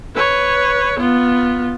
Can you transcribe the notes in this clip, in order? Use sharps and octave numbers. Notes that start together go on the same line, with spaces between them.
B4 C#5
B3 F4